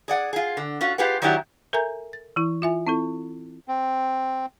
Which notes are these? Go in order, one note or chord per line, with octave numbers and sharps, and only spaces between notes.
G#4 D5 F#5
F4 G#4
D3
C#4 F4 F#4
F4 G4 G#4 B4 F#5
D#3 F#3 D4 E4 G4 F#5
A4 A#4 E5 G#5 A#5 G6
A6
E3 E4
F4 E5 G#5
C4 E4 A4
C4